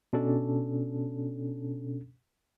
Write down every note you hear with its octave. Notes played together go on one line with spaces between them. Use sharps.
B2 C#4 D4 A4